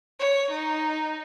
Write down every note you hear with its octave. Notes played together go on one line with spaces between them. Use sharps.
C#5
D#4